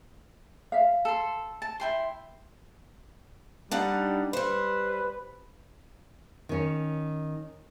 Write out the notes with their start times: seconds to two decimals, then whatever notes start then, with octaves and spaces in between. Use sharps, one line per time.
0.72 E5 F5
1.05 A4 C6
1.62 A5
1.80 E4 G5 C6
3.71 G3 D4 D#4 F#5
4.33 G3 B4 C5
6.49 D#3 C#4